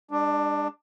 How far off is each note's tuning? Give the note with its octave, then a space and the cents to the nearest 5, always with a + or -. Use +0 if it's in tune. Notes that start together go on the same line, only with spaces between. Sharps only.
G#3 -45 D4 +15